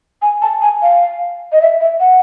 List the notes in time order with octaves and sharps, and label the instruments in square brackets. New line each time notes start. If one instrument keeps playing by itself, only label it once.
[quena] G#5
A5
G#5
F5
D#5
E5
E5
F#5